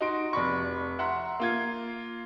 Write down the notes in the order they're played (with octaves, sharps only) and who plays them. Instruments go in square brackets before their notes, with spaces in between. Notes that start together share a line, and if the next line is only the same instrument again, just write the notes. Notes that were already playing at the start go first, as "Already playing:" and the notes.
[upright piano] D#4 F#4 C6 D7
F1 D5 B5 C#6
E5 F#5 A#5 C6
A#3 F4 G#6